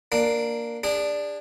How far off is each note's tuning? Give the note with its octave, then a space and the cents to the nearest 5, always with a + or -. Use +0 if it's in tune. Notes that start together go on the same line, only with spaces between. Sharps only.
A#3 +0 D4 +5
D4 +0 G#4 -35